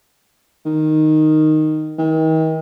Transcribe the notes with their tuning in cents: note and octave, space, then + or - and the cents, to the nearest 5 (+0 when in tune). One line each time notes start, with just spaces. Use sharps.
D#3 -5
D#3 +40